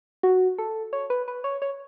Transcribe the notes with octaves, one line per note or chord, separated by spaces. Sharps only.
F#4
A4
C#5
B4
B4
C#5
C#5